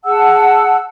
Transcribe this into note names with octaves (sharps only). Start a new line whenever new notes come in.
G#4 F#5 A5 E6